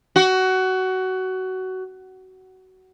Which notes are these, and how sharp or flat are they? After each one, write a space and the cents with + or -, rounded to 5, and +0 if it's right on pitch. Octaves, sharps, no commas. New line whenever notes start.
F#4 +20